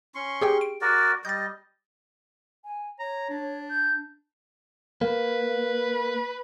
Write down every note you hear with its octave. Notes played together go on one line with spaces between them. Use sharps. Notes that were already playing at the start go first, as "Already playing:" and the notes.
C#4 C6 C#6
G4 G#4 G5
D7
F#4 A#4 D5
G3 D#5 G6 A6
G#5
C#5 A#5
D4
G6
A#3 B4